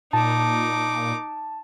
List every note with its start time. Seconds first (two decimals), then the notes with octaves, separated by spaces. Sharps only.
0.13 A#2 D#4 A5 D6